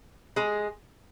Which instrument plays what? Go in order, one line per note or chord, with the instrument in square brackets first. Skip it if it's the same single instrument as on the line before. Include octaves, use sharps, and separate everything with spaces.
[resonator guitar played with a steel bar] G#3 G#4